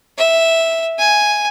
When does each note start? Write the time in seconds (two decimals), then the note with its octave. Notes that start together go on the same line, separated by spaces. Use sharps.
0.18 E5
0.98 G#5